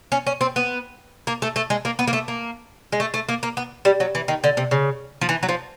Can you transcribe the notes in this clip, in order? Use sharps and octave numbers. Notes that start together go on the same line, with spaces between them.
C#4
C#4
C4
B3
A#3
A3
A3
G#3
A#3
B3
A#3
A3
A#3
G#3
A3
A3
A#3
A#3
B3
G3
F#3
E3
D#3
D3
C3
C#3
F3
E3
F#3
F3